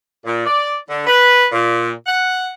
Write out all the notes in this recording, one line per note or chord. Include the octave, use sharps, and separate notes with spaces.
A#2
D5
D3
B4
A#2
F#5